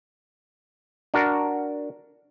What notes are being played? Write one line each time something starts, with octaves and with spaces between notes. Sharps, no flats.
D4 F#4 A#4